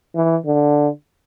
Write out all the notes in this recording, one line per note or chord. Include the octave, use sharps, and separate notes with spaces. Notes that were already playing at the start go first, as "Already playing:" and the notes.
E3
D3